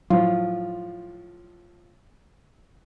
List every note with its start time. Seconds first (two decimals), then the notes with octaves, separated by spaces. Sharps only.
0.10 A2 F3 F#3 F4